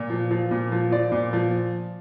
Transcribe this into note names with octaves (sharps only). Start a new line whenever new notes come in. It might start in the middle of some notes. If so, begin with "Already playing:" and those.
Already playing: A#2
F3
F3
A#2
F3
F3 D5
A#2
F3